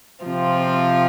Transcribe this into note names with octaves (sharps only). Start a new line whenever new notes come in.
C3 F3 C4 F4